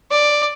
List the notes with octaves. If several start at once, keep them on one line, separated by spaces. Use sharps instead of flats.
D5